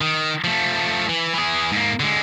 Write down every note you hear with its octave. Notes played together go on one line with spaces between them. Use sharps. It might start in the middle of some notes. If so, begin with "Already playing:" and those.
D#3
F3 A3
E3
E3 G#4
G#2 A#3
D3 G#3